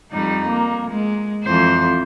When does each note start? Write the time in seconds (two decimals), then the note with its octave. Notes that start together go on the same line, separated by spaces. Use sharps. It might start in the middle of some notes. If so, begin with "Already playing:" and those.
0.12 F2 G3 D#4
0.48 A#3
0.90 G#3
1.44 F2 E3 C5